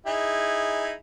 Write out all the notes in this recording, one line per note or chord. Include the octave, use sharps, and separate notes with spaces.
D#4 E4 G#4